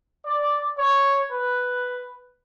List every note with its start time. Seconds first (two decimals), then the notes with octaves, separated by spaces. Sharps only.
0.24 D5
0.77 C#5
1.31 B4